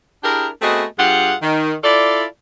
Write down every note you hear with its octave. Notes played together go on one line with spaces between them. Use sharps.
D4 E4 G4 G#4 A#4
A3 B3 C4 F#4 G#4 D#5
G2 F4 G4 G#4 F#5
D#3
E4 F4 A4 D5